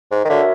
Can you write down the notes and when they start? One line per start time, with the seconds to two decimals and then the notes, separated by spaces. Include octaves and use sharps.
0.11 G#2
0.25 D#3
0.29 D3 F#4 A#4 C#5 E5